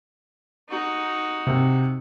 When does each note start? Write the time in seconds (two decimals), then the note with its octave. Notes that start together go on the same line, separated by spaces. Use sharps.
0.69 D#4 F#4
1.47 C3